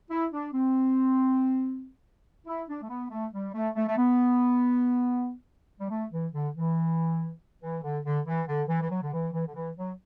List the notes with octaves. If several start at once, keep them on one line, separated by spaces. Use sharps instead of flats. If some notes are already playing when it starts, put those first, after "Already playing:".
E4
D4
C4
E4
D4
A3
B3
A3
G3
A3
A3
A3
B3
G3
A3
E3
D3
E3
E3
D3
D3
E3
D3
E3
E3
F#3
D3
E3
E3
D3
E3
F#3